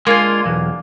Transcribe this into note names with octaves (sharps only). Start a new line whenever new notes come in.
G#3 A#3 D4 F4 G#5
B1 E2